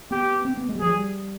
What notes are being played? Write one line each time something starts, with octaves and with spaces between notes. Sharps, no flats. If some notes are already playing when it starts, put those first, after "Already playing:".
B3 G4
C4
B3
G#3
G3
F3 G#4
G3